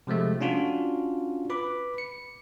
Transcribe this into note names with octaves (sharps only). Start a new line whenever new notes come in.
C3 F3 G#3 A3
C#4 D4 F4 F#4
B4 B5 D6
C#7